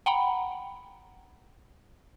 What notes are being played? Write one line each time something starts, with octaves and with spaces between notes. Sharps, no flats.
F#5 G5 A#5 B5